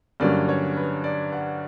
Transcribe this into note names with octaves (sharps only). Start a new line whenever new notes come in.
G2 D3 F#3 A#3 C#4 D5
C#5
B4
D5
F#5